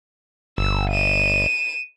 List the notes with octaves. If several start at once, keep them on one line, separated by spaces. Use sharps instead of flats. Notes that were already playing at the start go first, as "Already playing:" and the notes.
G1 E6
D#7 E7